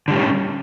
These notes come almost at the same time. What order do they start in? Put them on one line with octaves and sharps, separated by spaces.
D3 G3 A2 C#4